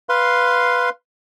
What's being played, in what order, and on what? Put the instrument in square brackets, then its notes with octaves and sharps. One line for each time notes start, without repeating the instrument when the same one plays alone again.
[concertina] B4 F5 C6